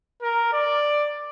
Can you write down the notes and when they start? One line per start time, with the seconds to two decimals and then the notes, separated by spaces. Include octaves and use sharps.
0.22 A#4
0.53 D5